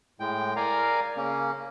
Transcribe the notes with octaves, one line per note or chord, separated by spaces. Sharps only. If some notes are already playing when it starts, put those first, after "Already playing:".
A2 G#3 G5
A#4 D5 F5 G#5 A#5
C#3 A#3 C#4